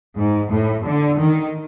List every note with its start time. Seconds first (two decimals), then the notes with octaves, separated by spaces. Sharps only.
0.17 G#2
0.51 A2
0.85 D3
1.19 D#3